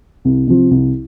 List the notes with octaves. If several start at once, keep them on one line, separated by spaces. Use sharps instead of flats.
C2
C3 F3
C2